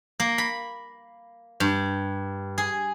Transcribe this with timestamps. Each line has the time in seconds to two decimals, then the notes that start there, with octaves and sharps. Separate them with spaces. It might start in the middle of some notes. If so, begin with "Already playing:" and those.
0.20 A#3
0.38 B5
1.60 G2
2.58 G#4